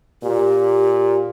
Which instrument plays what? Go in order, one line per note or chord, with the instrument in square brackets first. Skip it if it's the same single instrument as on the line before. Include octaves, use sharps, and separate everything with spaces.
[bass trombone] A#2 [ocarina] G4